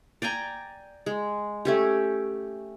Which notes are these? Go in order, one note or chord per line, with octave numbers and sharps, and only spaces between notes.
D5 G5 G#5 A#5
G#3
A3 C#4 G4